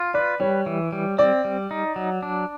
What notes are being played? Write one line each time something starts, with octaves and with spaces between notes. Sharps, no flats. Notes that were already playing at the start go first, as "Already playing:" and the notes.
Already playing: F4
B4 D5
G3 C#5
E3
G3
C4 D5
G3
D#4
F#3
D4